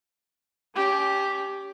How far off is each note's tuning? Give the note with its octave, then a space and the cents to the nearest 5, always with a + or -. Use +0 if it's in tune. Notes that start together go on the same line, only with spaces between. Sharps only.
C#4 +35 G4 +0